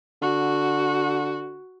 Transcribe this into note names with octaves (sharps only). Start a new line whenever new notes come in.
D3 F#4